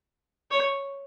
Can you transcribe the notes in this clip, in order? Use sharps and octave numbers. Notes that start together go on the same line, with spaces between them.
C#5